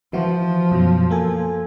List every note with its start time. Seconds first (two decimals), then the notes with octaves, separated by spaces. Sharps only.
0.13 E3 F3 E4 F#4
0.71 F#2 B2 F#3
1.10 A#3 A4 G#5